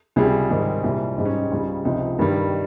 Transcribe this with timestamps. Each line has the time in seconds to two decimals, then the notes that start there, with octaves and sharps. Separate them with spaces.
0.16 C#2 C3 G3 G#4
0.50 G#2 D#3 G3
0.83 C2 A#2 G3
1.17 G#2 G3 D#4
1.25 C#4
1.33 D#4
1.51 C#2 C#3 G3
1.85 C#2 C3 F3 D#4
2.19 G2 D#3 G3